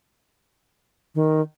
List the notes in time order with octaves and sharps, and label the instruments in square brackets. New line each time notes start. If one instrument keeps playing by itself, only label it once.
[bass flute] D#3